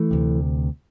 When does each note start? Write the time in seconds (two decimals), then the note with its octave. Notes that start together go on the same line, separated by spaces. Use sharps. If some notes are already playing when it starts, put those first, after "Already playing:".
Already playing: E3 A3
0.11 D2 C3